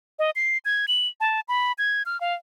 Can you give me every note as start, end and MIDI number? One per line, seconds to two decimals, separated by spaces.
0.19 0.30 75
0.36 0.58 96
0.65 0.86 92
0.88 1.08 102
1.20 1.40 81
1.48 1.72 83
1.78 2.03 92
2.06 2.20 89
2.21 2.34 77